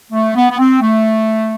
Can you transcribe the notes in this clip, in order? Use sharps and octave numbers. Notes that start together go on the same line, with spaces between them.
A3
B3
B3
C4
A3